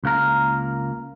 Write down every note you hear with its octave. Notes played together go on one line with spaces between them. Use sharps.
C#2 A#3 A#4